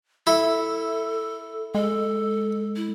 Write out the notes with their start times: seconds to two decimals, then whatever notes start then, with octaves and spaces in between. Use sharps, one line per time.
0.27 E4 A4
1.75 G#3 A4
2.76 E4